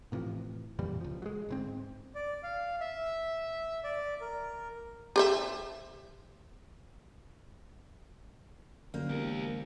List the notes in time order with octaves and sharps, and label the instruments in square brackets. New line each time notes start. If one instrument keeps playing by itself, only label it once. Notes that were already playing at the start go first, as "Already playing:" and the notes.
[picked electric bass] A2 C3 E3 F3
F2 A#2 E3 G3
C#2 F3
F#3 G#3
G1 G#2 C4
[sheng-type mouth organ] D5
F5
E5
D5
A#4
[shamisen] G4 C5 E5
[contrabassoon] F#2 [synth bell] D3 C5 G6 [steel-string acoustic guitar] A#3
[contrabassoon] E1 [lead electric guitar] G4 A#4